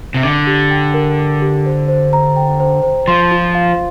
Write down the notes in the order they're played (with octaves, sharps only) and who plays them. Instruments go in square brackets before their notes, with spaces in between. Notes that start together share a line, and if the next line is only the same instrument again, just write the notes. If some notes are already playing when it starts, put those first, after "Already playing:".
[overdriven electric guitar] C3
[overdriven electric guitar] D3 [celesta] D6
[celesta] G4
G5
A#4
D6
G4
C5
C5
A#5
G5
C5
C5
[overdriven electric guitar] F3 [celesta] C6
[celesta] F4
F5